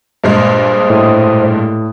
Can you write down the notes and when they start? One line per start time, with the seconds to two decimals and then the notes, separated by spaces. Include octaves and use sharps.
0.24 G2 A#2 G#3 C5 D#5
0.90 A2